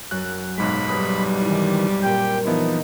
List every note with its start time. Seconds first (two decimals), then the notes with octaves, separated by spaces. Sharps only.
0.11 F#2 F#6
0.58 B1 G#2 G#3 B5
0.88 G3 B4 D#6
1.43 D#3 E3
2.03 A#2 A#3 C4 G4 G5
2.46 E3 F3 B3 D#4 E4